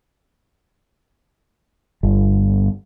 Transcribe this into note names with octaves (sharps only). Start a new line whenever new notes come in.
G1